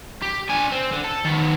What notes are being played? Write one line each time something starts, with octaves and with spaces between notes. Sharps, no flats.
G4
D4 G#5
C4
D3
A4
D#3 B3